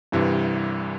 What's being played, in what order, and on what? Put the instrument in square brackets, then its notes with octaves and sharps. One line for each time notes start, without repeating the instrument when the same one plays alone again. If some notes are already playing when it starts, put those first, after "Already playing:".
[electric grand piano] C2 C3 E3 [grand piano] G2